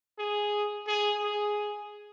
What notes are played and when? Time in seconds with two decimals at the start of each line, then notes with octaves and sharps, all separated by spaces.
0.19 G#4
0.87 G#4
1.22 G#4